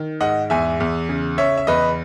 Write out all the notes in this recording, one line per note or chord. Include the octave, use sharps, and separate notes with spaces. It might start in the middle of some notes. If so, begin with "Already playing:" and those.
Already playing: D#3
G#2 D#5 F#5
E2 E5 G#5
E2
C#3
C#3 C#5 E5
E5
E2 B4 D#5